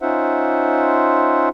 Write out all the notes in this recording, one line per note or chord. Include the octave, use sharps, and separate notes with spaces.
C#4 D#4 F4 C5 E5 F#5